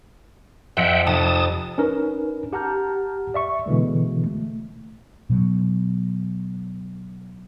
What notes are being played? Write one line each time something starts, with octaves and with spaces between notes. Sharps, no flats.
F2 E5 F#5 G5
F1 A5 D#6
C#4 D#4 A#4 B4
G4 F#5 A5 A#5 F6 G6
D5 E5 C#6
B2 D3 E3 G#3
A3
B2 F#3